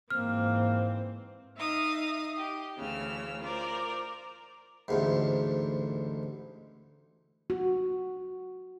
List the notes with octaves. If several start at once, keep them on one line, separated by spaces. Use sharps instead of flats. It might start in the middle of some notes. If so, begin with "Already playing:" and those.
G#2 E3 A#3 C4 F6
D#4 E5 F5 D#6
G4
D2 C#3 E3 E6 F6
F4 A#4 C5 D5
A1 D2 G#2
F#4